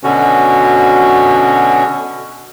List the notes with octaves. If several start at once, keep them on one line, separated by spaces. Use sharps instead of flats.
B2 D3 C#4 F#4